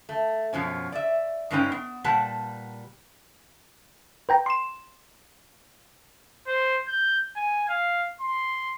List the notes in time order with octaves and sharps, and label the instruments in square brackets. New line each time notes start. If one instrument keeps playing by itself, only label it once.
[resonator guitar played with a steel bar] A3
F#2 B2 F3 C#4
D5 E5
G2 G#3 C#4 D#4 B4 G5
B3
A#2 G3 B4 F#5 A5
[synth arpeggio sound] B4 G5 A#5
C6 E7
[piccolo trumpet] C5
G6
G#5
F5
C6